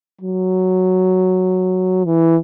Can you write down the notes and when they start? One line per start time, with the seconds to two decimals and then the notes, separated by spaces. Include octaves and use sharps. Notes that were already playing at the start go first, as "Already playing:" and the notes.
0.21 F#3
2.05 E3